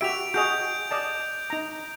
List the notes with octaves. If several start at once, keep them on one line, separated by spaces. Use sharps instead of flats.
F#4 G4 E5 D7 F7
F#4 G#4 D#5 G6 F7
D5 D#5 A5
D#4 A#5